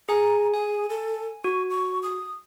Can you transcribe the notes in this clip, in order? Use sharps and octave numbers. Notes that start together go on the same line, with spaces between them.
G#4 G#5 A#5
G#4 G#5
A4
F#4 C#6
C#6
D#6